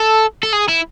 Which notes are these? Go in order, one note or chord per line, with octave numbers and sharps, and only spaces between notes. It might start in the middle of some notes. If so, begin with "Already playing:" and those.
Already playing: A4
A4
G#4
E4